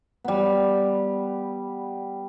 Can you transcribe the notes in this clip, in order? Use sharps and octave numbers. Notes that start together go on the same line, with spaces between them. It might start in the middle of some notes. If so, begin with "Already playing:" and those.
G3 B3